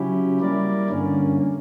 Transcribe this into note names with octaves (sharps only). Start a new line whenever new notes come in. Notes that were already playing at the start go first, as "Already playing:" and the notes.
Already playing: C#3 F#3 C#4 E4 G4
G3 A#3 E4 A#4 D5
G2 D3 A#3 C#4